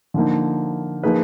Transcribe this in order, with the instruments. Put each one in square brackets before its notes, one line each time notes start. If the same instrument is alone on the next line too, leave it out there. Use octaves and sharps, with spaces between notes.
[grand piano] D3 F3 A#3 D#4
F3 A#3 D#4 G#4 B4